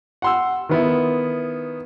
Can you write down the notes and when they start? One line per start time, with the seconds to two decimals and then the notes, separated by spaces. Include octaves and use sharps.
0.22 F#5 C6 E6
0.69 D#3 B3 E4